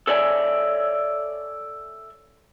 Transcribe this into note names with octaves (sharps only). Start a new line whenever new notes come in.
A4 C#5 D5 E5 G#5